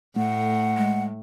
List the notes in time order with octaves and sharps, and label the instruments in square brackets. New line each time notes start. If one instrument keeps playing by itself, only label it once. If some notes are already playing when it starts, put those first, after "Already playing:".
[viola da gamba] A2 [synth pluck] A3 [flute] F#5
[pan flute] G#3